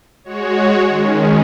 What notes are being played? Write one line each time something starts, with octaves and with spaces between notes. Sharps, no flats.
G#3 F#4 C#5
D#3 G#3 C#4